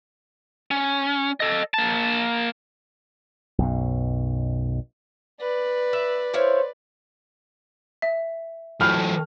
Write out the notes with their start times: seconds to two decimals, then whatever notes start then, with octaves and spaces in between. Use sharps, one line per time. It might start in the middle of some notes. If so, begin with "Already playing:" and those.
0.71 C#4
1.40 A4 D#5
1.74 A#3 A5
3.58 B1 F#2 B2
5.41 B4 D5
5.93 E5
6.34 E4 C5 C#5 F5
8.02 E5
8.81 A2 E3 F#3 F6